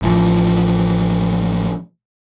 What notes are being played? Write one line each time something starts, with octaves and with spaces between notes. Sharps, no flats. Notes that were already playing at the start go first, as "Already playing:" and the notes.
A1 E3 F3